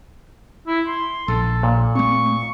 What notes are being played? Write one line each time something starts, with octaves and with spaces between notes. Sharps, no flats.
E4
C6
A#1 A4
A#2
A3 C4 C#6